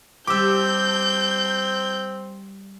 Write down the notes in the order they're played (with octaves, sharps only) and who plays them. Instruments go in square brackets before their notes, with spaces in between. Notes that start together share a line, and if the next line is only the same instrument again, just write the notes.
[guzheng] G3 G4 [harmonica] C4 [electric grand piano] D6 E6 [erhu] G6